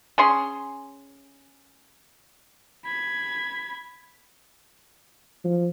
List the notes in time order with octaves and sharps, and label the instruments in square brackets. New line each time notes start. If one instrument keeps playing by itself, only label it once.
[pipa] C#4 G#4 C6
[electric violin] B5 G#6
[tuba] F3